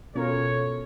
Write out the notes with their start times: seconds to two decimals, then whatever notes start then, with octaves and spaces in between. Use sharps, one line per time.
0.15 B2 C#4 F4 A4 A#4 C#5